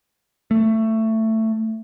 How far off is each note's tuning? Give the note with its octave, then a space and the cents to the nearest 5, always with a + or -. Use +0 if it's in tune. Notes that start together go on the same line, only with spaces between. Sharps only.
A3 +15